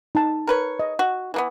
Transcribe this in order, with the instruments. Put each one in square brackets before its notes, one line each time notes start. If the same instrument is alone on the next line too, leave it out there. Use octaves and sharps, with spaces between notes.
[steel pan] D#4 A5
[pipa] A#4 B4 C#5
[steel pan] D#5
[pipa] F#4
E3 A#3 B3